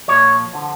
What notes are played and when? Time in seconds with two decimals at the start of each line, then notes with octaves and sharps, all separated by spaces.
0.08 A#2 F3 C#5
0.53 D3 F3